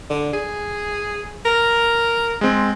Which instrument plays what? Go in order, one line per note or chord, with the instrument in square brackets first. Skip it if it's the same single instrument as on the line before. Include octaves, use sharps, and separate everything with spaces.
[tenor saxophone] D3
G#4
A#4
[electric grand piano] G#3 C4